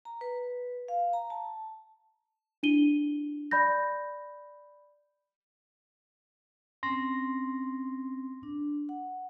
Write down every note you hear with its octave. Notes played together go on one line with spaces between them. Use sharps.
A#5
B4
F5
A#5
A5
D4 E4 D#7 G7
D5 B5 G6 A#6
C4 C#4 C6 A#6
D4
F#5